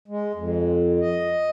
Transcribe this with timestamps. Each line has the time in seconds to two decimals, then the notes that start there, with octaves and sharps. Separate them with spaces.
0.08 G#3
0.34 F2
1.01 D#5